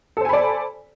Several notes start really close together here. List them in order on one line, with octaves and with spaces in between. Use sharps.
A4 C5 G#5 B5 D5